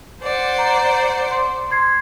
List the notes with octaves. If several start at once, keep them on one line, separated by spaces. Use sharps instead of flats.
C5 D5 F#5
A#5
C6
C6 G#6 C7